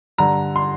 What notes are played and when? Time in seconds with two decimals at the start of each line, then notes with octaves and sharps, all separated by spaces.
0.18 G2 D3 A#5
0.56 C6